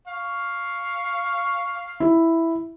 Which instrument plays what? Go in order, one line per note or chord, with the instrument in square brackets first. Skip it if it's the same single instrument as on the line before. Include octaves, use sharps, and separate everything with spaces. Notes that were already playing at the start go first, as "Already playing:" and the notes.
[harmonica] F5 C#6
[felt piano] E4